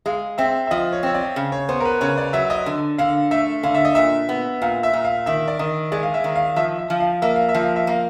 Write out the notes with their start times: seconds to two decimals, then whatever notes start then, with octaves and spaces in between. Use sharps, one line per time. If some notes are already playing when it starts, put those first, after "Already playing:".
0.06 G#3 F5
0.38 C4 E5
0.67 E5
0.71 F3 D#5
0.93 C#5
1.03 C4 C#5
1.14 D5
1.36 C#3
1.52 C#5
1.69 B3 C5
1.80 A#4
1.85 B4
2.01 C#3 C#5
2.18 D5
2.33 F#3 E5
2.50 D#5
2.66 D3
2.98 D3 F5
3.31 A3 E5
3.63 D3 F5
3.75 E5
3.85 D#5
3.95 A#2 E5
4.29 B3
4.62 A#2 F5
4.83 E5
4.94 A#2
5.05 F5
5.26 D#3 E5
5.48 D5
5.59 D#3 D#5
5.92 G#3 D5
6.03 F5
6.14 E5
6.24 D#3
6.36 F5
6.56 F3 E5
6.78 E5
6.90 F3
7.00 F5
7.22 A#3 E5
7.36 F5
7.49 E5
7.55 F3
7.62 F5
7.76 E5
7.87 A#3 F5